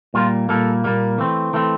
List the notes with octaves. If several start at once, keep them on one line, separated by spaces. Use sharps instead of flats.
A#2 G3 A#3 F4
A#2 G3 A#3 A4
A#2 G3 A#3
E3 A3 C4
E3 A3 C4